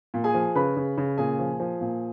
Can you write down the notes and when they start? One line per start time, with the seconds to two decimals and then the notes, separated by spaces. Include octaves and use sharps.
0.14 A#2
0.24 G#4 G#5
0.34 F3
0.55 C#3 B4 B5
0.76 C#3
0.98 C#3
1.18 A#2 G#4 G#5
1.39 F3
1.60 F3
1.81 A#2